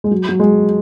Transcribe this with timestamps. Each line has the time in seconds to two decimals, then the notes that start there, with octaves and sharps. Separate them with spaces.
0.04 G#3
0.11 F#3
0.29 F#3
0.40 G#3